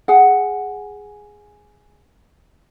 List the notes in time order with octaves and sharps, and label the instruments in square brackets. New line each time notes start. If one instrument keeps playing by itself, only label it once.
[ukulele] G#4 F#5